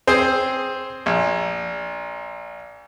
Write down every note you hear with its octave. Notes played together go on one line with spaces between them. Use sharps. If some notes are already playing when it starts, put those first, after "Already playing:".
C4 G#4 C5
A#1